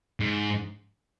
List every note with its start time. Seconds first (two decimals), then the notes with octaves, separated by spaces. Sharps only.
0.20 G#2